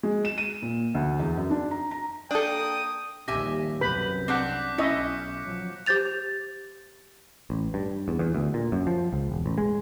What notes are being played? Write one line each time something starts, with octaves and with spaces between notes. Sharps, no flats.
G#3
E7
D#7
A#2
D2
E2
F#2
D4
A#5
A#5
A#3 D4 A4 G5 D#6
A#1 D#2 G3 G4 E5 G#5 A#6
C2 F#2 C3 B4 B5 G6
C4 D4 F#5 D6 F#6 B6
B1 C#4 E4 D#5 E5 C#7
F3 F#3
G4 C5 G6 A6 F7
A1
G2
E2
E2
D2
A#2
F#2
F3
C#2
E1
A1
G#3